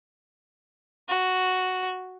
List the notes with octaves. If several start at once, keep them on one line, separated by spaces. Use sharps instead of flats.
F#4